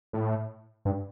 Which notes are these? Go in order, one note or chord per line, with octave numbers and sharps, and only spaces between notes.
A2
G2